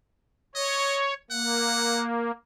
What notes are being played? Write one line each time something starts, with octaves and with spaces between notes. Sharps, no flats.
C#5 D#5
A#3 F#5